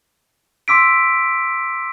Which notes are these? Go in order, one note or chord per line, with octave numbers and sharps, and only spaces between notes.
C6 D6 E6 B6 D7